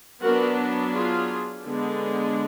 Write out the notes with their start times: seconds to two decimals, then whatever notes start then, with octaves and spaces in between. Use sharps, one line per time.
0.22 F#3 B3 D4 F#4 A#4
0.93 F4 G#4
1.63 D3 G#3 B3 D4